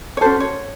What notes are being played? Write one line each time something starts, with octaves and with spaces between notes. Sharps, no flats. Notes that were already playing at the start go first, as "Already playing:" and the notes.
C#5
C#4 F#4 A4 C5
C#5